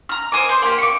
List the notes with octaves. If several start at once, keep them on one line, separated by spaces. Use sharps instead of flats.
A#5 F6
C5 D#5 G#5 D6
C5
A#3 G4
C#6 D6